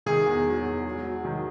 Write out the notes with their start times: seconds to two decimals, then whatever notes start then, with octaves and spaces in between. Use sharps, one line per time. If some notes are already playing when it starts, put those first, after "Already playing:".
0.06 D#3 G#4
0.26 E2
0.46 F#3
0.65 E2
0.85 F#3
1.04 F#3
1.25 D#3